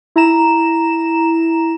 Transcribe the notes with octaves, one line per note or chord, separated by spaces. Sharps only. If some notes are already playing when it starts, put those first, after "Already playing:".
E4 A#5 E7